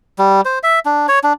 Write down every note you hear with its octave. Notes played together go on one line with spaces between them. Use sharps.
G3
C5
E5
D4
C#5
D4